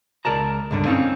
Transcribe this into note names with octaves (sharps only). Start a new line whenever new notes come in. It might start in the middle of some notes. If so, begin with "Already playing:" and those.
C#2 A#4 D5 A5 A#5
C#2 G2 D3
A#3 C4 C#4 D#4 C#5